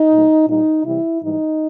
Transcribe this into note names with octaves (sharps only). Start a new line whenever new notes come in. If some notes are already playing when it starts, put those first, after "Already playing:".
Already playing: D#4
A#2 F#3 A3
A#2 G3 D#4
C3 E3 G3 E4
G#2 E3 G3 D#4